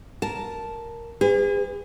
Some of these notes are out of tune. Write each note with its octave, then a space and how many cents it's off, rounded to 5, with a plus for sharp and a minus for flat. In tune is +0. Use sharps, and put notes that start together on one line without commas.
A#4 +0 A5 -5
G#4 -40 B4 +35